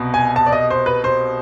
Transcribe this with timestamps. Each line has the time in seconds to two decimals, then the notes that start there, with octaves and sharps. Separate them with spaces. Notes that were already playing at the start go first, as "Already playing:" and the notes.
Already playing: C2 B2
0.14 G#5
0.36 A5
0.46 D5
0.52 D#5
0.70 C5
0.86 B4
1.04 C5